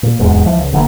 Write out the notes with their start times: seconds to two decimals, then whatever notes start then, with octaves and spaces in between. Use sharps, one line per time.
0.03 A#2
0.19 D1 E2 G#2 G#3
0.44 C#2 E3 F3
0.58 C#2
0.72 F#1 D3 E3 A#3